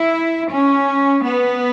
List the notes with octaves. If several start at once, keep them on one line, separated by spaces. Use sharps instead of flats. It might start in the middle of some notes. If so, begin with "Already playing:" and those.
Already playing: E4
C#4
B3